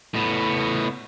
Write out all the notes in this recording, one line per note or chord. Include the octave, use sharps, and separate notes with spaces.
A2 B3